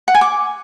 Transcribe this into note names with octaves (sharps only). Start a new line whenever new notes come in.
F#5
G#5
D6